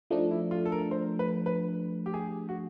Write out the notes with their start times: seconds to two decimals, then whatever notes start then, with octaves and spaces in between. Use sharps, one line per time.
0.11 F3 A3 D4 D#4
0.31 E4
0.51 F4
0.66 A4
0.72 A#4
0.91 C5
1.19 B4
1.46 B4
2.06 G4
2.14 G#4
2.49 F#4